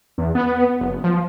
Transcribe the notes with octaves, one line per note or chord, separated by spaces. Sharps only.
E2
B3
F#1
F3